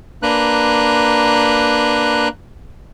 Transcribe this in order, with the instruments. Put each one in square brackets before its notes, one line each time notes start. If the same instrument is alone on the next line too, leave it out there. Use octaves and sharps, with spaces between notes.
[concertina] A#3 D4 B4 A#5 F#6